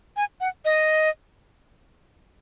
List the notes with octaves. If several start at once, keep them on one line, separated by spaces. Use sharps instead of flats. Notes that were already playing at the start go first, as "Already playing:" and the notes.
G#5
F#5
D#5